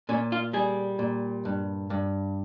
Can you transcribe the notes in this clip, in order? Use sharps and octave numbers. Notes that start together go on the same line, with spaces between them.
A#2 C#4
F4
G3 G#4
A#2
G2
G2